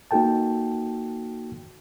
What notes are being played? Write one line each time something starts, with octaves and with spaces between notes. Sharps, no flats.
A#3 D#4 F#4 A4 G5 A5